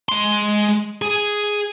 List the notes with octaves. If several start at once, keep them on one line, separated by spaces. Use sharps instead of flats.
G#3 C6
G#4